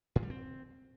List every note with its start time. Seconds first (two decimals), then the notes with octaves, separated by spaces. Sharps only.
0.16 A2
0.23 G3
0.30 C4